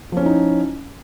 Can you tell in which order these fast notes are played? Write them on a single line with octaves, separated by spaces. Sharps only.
F3 C#4 E4 D#4